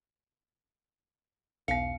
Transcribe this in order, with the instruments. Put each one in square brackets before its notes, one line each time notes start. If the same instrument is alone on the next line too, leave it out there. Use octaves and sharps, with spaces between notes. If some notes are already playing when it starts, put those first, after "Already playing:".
[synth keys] B1 [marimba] E2 B3 [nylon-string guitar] F5 [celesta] C#7